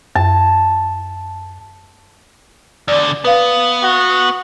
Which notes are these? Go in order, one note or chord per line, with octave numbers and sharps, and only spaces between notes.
F#2 A5
E2 D3 D5
B3 B4 F5
F#4